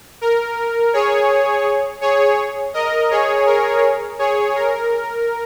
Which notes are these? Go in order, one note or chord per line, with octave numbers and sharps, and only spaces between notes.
A#4
G#4 C#5
G#4 C#5
A#4 D#5
G#4 C#5
A#4
G#4 C#5
A#4